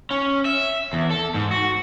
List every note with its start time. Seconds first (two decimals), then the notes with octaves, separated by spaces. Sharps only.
0.11 C#4
0.45 E5
0.93 E2
1.11 A4
1.34 G#2
1.51 F#4